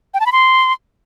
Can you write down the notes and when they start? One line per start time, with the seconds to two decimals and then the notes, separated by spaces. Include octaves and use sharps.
0.14 G5
0.20 A5
0.26 B5
0.32 C6